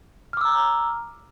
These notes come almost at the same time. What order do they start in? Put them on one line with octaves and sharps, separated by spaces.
F6 D6 E6 A#5